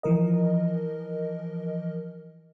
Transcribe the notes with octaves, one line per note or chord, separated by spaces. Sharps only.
E3 F3 A#4 D#5